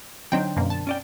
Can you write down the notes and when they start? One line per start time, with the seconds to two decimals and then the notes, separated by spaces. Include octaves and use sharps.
0.32 D3 F#3 C4 D4 D#4 G5
0.57 F#2 B2 A#3
0.70 A5
0.87 C#4 D5 G5